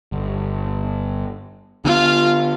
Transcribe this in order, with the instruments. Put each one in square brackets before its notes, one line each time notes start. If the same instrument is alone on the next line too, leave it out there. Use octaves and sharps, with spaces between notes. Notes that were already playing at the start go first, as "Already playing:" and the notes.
[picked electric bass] G1
[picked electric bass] D3 B3 [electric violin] F4 F5